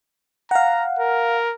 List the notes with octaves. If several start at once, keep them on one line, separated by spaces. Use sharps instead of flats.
F5 F#5 A#5
A#4